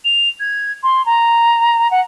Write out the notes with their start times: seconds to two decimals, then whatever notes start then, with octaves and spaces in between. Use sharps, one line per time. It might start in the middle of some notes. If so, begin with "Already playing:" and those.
0.05 F7
0.40 G#6
0.83 C6
1.06 A#5
1.91 F#5